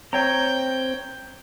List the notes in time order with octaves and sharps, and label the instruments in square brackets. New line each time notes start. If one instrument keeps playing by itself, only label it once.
[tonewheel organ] C4 [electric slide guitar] C#5 A#5 [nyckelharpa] G5